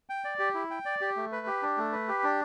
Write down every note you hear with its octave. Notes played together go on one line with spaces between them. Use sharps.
G5
D5
G4
E4
G5
D5
G4
A3
B4
G4
D4
A3
B4
G4
D4